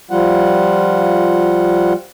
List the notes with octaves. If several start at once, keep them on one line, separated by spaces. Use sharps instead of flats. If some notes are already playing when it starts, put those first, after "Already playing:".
F3 G3 F4 F#5